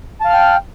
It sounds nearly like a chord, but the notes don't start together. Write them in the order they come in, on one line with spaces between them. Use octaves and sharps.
A5 F5 F6 G5